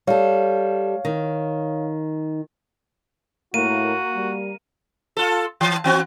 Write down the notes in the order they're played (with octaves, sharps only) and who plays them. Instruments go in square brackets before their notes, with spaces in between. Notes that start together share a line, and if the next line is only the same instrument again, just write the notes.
[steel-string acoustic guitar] G3 A4 [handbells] C#5 F5
[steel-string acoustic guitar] D#3
[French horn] A2 [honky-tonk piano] A#3 [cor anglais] F#4 [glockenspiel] D#7
[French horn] G3
[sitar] F4 A4
E3
E3 C4 F#4